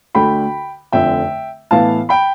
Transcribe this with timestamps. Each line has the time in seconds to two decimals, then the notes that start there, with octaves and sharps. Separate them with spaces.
0.15 D2 D3 A3 D4 G5 B5
0.92 F1 F2 D3 E5 G5
1.71 A2 E3 B3 E4 F5 A5
2.09 G5 B5